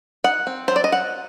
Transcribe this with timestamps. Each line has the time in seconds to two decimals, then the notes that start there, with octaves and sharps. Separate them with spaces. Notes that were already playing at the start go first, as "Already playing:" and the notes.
0.24 D#4 F#5
0.47 C4
0.68 F#3 C5
0.76 D5
0.84 D#5
0.92 F#3 F#5